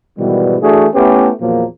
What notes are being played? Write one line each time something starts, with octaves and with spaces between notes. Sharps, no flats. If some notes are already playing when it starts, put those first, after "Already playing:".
G#2 B2 D#3 E3 G3
E3 A3 D4 F#4 G#4
A3 B3 C#4 E4 G4 B4
E2 A#2 F3 F#3 A#3